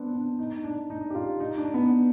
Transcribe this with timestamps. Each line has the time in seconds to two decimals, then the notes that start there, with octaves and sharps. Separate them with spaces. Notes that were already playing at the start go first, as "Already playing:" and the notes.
Already playing: B3 C4 D4
0.13 D4
0.39 D#4
0.64 D4
0.90 D#4
1.10 G4
1.15 F4
1.40 D#4
1.57 D4
1.74 B3